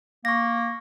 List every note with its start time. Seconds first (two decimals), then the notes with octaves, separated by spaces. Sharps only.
0.25 A#3 C#6 A#6